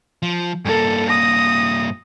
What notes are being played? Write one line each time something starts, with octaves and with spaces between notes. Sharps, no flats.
F3
G2 A#3 A4
D#6 A#6